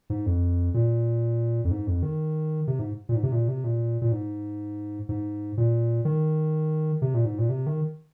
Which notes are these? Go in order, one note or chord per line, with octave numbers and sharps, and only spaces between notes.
G#2
F2
A#2
F2
G#2
F2
D#3
C3
G#2
A#2
G#2
C3
A#2
C3
A#2
A#2
G#2
G#2
A#2
D#3
C3
A#2
G#2
A#2
C3
D#3